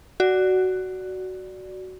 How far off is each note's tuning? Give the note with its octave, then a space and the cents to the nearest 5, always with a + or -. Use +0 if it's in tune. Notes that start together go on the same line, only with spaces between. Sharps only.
F#4 +10 D5 +0